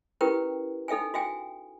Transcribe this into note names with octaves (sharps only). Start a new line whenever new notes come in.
C#4 E4 G4 A#4 B4 G5
D#4 A4 E5 G5 G#5
F#4 E5 G5 G#5